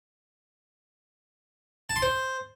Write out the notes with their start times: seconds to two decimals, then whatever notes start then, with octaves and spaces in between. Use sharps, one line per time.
1.90 A5
1.96 C6
2.02 C5